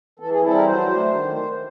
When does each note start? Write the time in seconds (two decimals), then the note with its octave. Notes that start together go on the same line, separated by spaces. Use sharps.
0.19 E3 A4
0.31 G#4
0.43 G3 C4 E4 A4
0.54 A#4
0.66 F#3 C5
0.89 A3 D4
1.12 D#3